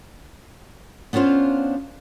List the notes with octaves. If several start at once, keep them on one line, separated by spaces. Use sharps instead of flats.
B3 C#4 D4 F4 C5 F5